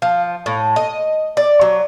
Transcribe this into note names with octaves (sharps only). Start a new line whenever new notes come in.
F3
A2
D#5
D5
F#3